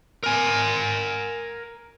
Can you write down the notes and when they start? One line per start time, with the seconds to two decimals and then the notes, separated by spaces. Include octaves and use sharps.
0.23 A#4 G#5